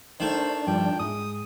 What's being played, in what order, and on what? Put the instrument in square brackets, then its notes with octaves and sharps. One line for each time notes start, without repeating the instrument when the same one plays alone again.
[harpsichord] D#3 A3 [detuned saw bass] D4 [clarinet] C5
[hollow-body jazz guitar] G2 F3 G3 [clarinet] G5
[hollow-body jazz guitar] G#2 [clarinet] D#6